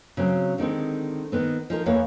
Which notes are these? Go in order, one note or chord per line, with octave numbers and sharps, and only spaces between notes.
C#3 F#3 C4
D3 D#3 G#3 C4
D#3 B3 C4
F3 D#4 A#4
E2 E3 A#3 C#5 F5